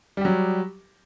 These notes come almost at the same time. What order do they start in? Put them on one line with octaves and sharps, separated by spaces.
G3 G4 F#3